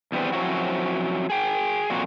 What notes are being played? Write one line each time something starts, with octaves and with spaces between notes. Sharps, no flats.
E2 G3 B3 C4 B4
F3 F#3 C4 C#4 E4 F#4
G#4 G5
F2 A#2 F#3 A#3 F#4